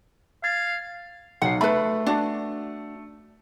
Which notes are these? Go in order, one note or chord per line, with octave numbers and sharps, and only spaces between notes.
F5 G#6 A6
B1 F#5 C7
A3 B4 B5
D4 F#4